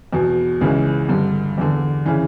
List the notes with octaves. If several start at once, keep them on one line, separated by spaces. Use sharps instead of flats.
E2 B2
C#2 C#3 E3
G2 D3
E2 D3
C#3 E3